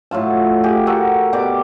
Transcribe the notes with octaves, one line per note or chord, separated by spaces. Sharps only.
A2 F#3 F4 A5
G4 G#4
F#4 A4 A#4
B2 G4 D5 D6